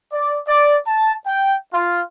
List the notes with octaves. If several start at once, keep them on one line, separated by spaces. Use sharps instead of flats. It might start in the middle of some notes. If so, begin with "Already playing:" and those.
D5
D5
A5
G5
F4